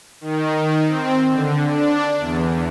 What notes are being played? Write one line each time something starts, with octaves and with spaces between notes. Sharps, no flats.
D#3
C4
D3
D4
E2